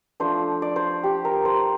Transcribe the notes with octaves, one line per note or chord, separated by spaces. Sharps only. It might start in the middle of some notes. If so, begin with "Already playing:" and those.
F3 A3 D4 C5
D5
C5
G4
A#4
C5